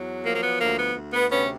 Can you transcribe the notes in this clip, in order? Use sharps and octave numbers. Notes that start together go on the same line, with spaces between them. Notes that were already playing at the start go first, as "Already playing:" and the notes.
Already playing: E2 F#3
F3 A#3
A#3
B3
D2 A#3
B3
D2
B3
C3 B3 C#4